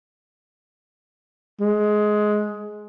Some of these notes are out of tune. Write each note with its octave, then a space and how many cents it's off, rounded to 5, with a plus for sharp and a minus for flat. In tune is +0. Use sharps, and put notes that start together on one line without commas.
G#3 +15